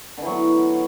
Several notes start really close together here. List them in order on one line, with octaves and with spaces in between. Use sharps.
D3 E3 F#3 B3